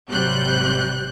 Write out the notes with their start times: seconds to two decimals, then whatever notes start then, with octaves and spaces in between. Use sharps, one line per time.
0.11 G#1 C3 F#3 G3 F#6 G6